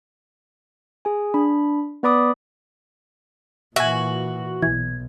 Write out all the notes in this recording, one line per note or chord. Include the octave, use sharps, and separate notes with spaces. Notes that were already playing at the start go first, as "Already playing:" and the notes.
G#4 G#5
D4 B5
B3 B4 D5 B5 D6 D#6
A#2 E3 F#4 E5 G#5
B1 E3 G#6